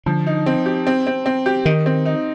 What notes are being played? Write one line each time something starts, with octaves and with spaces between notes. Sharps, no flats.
D3 F3
D#4
C4
G4
C4
C4
C4
G4
D#3 D#4
C4
D#4